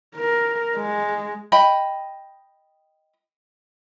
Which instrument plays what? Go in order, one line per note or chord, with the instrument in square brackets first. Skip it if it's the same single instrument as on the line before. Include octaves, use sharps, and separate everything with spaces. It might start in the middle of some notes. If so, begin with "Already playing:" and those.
[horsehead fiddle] A#4
G#3
[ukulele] D#5 G5 B5